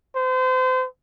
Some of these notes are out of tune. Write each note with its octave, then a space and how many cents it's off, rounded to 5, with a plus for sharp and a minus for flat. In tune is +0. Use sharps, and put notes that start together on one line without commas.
C5 -35